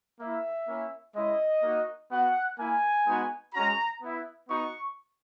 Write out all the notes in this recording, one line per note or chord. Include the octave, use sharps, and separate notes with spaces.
A#3 E4 E5
A#3 C#4 E4
G#3 C#4 E4 D#5
A#3 D#4 F#4
B3 F#4 F#5
A#3 E4 G#5
G#3 B3 D#4 F#4
G#3 C#4 F#4 A#5
B3 E4
B3 D#4 F#4 C#6